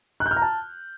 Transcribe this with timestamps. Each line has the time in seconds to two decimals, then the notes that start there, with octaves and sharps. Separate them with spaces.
0.20 F#6
0.26 G6
0.31 F6
0.36 A#5
0.42 A5